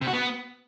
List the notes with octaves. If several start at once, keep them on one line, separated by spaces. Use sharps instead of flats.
C3
F#4
B3